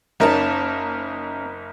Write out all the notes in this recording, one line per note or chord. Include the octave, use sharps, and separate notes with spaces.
F#1 A#3 C#4 D#4 A#4 A5